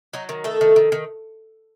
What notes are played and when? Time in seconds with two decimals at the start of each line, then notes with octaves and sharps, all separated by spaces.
0.13 F#3 D#4
0.29 D#3
0.44 A3 A4
0.61 D#3
0.76 D#3
0.92 D#3